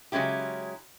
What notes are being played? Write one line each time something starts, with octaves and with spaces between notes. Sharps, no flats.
C#3 F#3 G#3 C#4 E4 G4